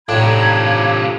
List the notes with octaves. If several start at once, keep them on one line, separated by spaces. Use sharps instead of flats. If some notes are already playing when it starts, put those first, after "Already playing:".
A2 C3 D4 D#4 F4 B5 G#6